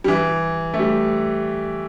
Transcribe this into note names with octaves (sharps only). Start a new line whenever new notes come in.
G3
E3
A3
G3